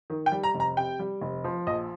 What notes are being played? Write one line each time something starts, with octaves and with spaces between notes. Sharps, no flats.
D#3
G5
G3
A#5
F1
A#5
C3 G5
G3
F1
F3
A#1 D#5